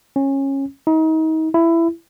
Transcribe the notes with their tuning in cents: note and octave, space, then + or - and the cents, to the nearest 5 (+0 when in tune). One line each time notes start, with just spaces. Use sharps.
C#4 -20
D#4 +35
E4 +15